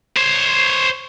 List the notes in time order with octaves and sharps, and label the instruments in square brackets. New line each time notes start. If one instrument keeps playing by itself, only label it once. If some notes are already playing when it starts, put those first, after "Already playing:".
[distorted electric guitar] C5 C#5